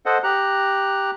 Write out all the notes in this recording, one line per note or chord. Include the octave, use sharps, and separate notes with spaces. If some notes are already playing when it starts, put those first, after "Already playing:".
A4 C5 D#5 F#5
G4 A#5 F#6